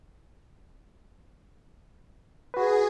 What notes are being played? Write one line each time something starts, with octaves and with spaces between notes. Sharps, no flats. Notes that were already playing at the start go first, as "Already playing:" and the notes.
F#4 G#4 B4